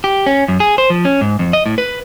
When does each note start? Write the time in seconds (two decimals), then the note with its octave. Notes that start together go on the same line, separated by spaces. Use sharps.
0.04 G4
0.26 C#4
0.48 F#2
0.60 G#4
0.78 C5
0.90 F3
1.05 C#4
1.21 G#2
1.39 F2
1.53 D#5
1.66 A2
1.78 B4